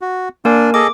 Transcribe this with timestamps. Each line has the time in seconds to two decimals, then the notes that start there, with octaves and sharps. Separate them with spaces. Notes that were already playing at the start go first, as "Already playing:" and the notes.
0.01 F#4
0.45 A#3 D4 A#4 D5 G#5
0.74 G#4 A4 D#5 D6